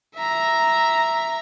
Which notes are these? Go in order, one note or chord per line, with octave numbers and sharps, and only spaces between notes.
E5 A#5